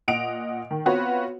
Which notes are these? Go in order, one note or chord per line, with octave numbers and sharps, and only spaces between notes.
A#2 D#5 F#5 D7 F7
D#3
B3 C4 F4 F#4 B4 C#5